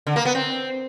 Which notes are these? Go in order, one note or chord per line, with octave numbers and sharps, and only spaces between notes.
D3
A#3
B3
C4